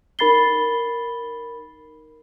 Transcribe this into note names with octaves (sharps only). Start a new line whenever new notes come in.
D#4 A#4 B5 A6 C7 G7